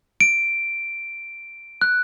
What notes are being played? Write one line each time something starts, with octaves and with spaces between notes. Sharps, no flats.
D7
F#6